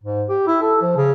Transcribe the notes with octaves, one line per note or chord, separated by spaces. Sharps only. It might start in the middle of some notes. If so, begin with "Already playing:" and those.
G#2
G4
E4
A4
F3
C#3